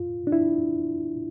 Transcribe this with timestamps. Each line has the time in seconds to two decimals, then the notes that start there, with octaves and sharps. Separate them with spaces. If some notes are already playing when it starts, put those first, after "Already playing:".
Already playing: F4
0.27 D4
0.32 E4